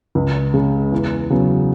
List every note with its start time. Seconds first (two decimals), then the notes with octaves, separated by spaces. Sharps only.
0.15 C#2
0.54 C#3 G#3
0.92 E2
1.30 C#3 F#3 B3